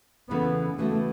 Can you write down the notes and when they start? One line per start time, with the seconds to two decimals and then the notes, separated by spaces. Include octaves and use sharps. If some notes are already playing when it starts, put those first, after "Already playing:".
0.30 E2 C#3 E3 A3 B3
0.78 C#3 E3 A3 B3 F#4